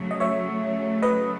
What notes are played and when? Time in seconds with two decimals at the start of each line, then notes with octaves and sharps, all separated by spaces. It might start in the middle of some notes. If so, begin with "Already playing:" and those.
Already playing: C#3 F#3 A3
0.11 D#5
0.20 C#5 E5
1.02 B4 D#5